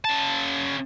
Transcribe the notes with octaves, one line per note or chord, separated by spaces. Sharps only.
C#3 A5